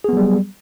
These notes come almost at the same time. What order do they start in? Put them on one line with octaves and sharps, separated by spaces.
G#4 B3 F#3 G3